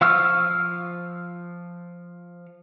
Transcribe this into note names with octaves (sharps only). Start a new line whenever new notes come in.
F3 F5 C#6 E6 F6